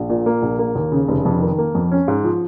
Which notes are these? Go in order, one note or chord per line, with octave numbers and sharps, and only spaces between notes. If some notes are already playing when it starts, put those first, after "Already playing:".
Already playing: A#1
A#2
A#3
A#1
A#3
D#2
C#3
F1
F2
D#3
A#3
F2
C#4
G#2
F3